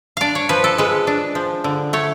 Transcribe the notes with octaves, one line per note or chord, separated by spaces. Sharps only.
D4 D5 F5
C#5
F3 B4
A4
G#3 B4
D4
F3
D3
A3 C#5